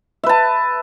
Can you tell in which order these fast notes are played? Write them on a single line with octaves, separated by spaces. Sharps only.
E5 B4 A5